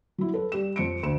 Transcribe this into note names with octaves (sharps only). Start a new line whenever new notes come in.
F#3 E4
A4 B4
G3 G4 E7
F2 C#7 D7
D2 E7